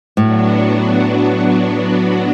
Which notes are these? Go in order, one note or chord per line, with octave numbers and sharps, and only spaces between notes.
A2 F#3 B3 D4 F#4